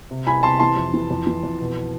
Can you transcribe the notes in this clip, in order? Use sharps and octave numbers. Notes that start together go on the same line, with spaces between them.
C3
C2 G#5 B5
C3 A5 C6
E3 A5 C6
F2
E3
F2
E3
F2
B2